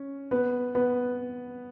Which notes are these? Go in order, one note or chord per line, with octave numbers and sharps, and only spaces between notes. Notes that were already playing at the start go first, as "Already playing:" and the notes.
Already playing: C#4
B3 B4
B3 B4